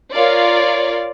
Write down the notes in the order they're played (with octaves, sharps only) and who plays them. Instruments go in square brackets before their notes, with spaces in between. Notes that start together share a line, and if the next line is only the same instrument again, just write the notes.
[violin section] F4 A#4 C#5 D5 F5